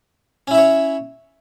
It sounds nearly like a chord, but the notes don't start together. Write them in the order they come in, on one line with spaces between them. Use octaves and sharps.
C#4 E4 E5 C#5